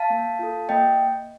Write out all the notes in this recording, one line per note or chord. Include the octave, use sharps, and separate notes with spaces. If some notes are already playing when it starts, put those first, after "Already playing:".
Already playing: F5 A5
A#3
F4 A4
A#3 D#5 G5